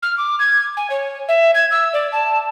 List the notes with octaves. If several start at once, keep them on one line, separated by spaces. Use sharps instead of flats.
F6
D6
G#6
G#5
C#5
E5
G#6
E6
D5
A5